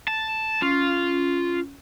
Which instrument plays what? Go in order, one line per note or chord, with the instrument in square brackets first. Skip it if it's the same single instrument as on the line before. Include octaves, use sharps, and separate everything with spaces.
[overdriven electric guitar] A5
[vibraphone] C#4 [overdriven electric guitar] F4